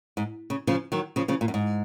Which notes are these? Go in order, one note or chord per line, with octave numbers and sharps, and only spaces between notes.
G#2
C#3
C#3 F3
D#3 F#3
C#3 F3
C#3 F3
A#2
F#2
G#2